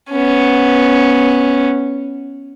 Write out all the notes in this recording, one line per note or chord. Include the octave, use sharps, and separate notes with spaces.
B3 C#4